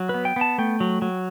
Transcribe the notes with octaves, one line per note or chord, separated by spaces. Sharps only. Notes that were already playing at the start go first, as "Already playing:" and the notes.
Already playing: F#3
B4
B3
G5
B3 A5
A3 G5
F#3
F#3